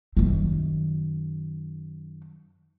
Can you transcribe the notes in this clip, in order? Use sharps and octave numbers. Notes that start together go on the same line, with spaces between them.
F#2 D#3